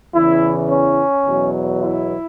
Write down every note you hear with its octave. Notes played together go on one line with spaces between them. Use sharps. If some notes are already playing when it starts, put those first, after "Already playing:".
E2 C#3 E3 E4
C#4
E2 B2 F#3
E4